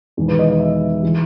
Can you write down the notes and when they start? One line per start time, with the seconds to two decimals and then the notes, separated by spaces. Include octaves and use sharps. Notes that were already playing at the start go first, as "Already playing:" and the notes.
0.17 E1 E2 D#3
0.28 B4
0.39 D#5
0.49 D#5
0.60 E5
1.03 E3 G#3